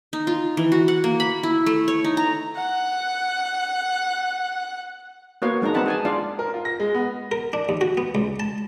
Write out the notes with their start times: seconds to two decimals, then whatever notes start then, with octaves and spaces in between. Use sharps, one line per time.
0.13 D#4
0.27 F4
0.57 E3
0.72 F#4
0.88 F#5
1.04 A#3
1.20 B5
1.43 E4
1.66 A3
1.88 C#5
2.04 D#4
2.17 A#5
2.56 F#5 F#6
5.42 A#3 B3 F#4 C#5 F5
5.62 G#3 D4 D#4 A#5
5.74 B3 C4 D#4 F#5 A5 B5
5.86 G#4 G#5 A5
6.05 D4 F4 D5 F5
6.39 A#4
6.54 F4
6.65 A#6
6.80 G#3
6.94 B3
7.32 A#4
7.53 D4
7.69 D#2
7.81 F#4
7.97 B3
8.15 C#2
8.40 A5